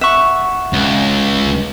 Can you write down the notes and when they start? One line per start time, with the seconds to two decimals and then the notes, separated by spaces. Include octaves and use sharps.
0.01 E5 F#5 C#6
0.73 C#2